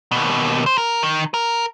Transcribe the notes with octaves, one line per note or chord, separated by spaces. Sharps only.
D#2 B2
C5
A#4
D#3
A#4